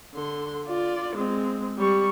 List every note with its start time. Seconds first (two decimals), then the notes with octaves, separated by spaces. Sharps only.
0.14 D3 C6
0.68 F4 D5
1.16 G#3 C4
1.79 G3 C#6